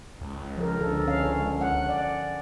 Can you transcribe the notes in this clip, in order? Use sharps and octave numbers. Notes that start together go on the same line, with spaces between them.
C#2
F3 A#4
D3 A4
C#4 F5
F#5
D5